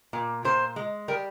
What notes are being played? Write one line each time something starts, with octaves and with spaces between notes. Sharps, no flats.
A#2
A#2 C5
G#3
G3 A#4